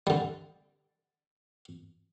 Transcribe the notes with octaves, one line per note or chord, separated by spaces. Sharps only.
D3 G3